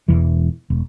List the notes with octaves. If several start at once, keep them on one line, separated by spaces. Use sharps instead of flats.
E1 E2 E3
E1